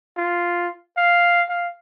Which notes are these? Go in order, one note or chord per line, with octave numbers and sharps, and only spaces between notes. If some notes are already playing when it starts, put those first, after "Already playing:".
F4
F5
F5